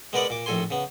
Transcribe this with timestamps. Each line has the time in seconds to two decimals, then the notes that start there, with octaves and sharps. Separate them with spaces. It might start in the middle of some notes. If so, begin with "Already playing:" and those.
0.13 G#3 B3 A#4 B4 D5 F#5
0.30 A#2 D6
0.46 A#1 A2 A4 G#5 C6
0.71 C#3 B3